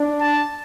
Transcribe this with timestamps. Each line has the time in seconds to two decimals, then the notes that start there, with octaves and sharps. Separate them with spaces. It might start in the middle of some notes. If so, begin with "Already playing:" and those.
Already playing: D4
0.21 A5